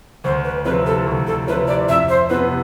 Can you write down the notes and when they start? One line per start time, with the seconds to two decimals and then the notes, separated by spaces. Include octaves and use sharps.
0.24 D2 C5
0.45 B4
0.65 C3 F3 C4 E4 B4
0.86 A4
1.07 D2
1.27 A4
1.47 C3 F3 C4 E4 B4
1.68 D5
1.89 F2 E5
2.09 C5
2.30 C3 E3 B3 B4